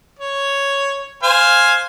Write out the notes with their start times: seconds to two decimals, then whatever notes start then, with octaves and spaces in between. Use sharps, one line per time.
0.19 C#5
1.23 C5 F5 G#5